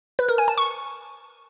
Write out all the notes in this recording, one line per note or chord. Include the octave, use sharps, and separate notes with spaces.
B4
A#4
G#5
A5
C#6